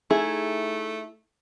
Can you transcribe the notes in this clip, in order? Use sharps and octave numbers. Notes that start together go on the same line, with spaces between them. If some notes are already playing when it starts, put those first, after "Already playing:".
A3 D#4 E4 G#4